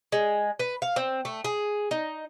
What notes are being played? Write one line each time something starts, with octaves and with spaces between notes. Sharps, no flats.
G#3
B4
F5
C4
A3
G#4
D#4